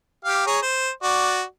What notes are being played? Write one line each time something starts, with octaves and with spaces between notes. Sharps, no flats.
G4 F5
G#4 C#5 A#5
C5
F#4 D5